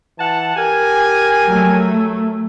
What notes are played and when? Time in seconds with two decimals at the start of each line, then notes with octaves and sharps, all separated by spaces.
0.18 E3 F#5 A5
0.56 G4 A#4 G#5
1.47 F#3 A3